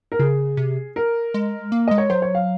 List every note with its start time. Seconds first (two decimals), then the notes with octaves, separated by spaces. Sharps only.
0.12 A#4
0.19 C#3 G#4
0.57 C3
0.96 A#4
1.34 G#3
1.72 A#3
1.88 G#3 D#5
1.98 C#5
2.10 F#3 C5
2.22 C#5
2.35 F5